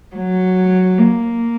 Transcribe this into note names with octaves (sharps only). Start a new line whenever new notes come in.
F#3
A#3